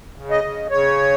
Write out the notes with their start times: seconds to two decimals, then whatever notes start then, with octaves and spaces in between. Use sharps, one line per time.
0.16 C#3
0.30 D#5
0.44 C#3
0.70 C#3 C#5